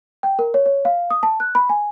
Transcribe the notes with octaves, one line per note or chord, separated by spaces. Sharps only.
G5
A#4
C#5
C#5
F5
D#6
A5
F#6
B5
G#5